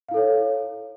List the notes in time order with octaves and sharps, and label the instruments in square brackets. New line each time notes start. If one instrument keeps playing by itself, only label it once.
[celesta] F5
E4
A4
C#5